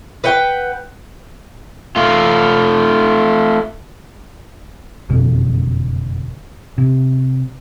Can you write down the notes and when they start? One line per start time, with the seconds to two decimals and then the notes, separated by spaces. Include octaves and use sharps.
0.24 B4 F#5 G5
1.96 A3 F4
5.09 F#1 F2 B2 D3
6.78 C3